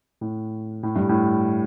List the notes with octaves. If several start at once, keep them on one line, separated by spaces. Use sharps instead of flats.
A2
A2
G2
A2